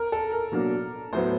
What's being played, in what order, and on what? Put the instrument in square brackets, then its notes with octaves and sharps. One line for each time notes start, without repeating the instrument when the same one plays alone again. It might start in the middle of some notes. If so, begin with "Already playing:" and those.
Already playing: [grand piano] A#4
A4
A#4
[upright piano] B2 F#3 A#3 D4
[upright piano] A2 F#3 B3 [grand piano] C5